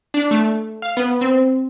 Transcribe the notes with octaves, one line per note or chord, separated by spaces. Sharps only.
D4
A3
F5
B3
C4